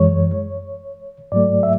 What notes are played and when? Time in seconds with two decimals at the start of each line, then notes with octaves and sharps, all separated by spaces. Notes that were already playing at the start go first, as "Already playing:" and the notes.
Already playing: F#2 E3 G#3 C#5
1.32 G#2 F#3 A3 D5
1.63 E5